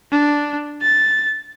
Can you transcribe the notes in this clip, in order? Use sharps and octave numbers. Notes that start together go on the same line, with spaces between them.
D4
A6